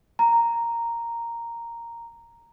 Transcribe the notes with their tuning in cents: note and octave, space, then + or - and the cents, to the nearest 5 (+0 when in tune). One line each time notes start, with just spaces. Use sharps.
A#5 -5